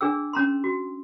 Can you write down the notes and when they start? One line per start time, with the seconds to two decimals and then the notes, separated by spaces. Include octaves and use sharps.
0.01 D4 G#4 G5 E6
0.33 C#4 A#5 C6
0.64 F#4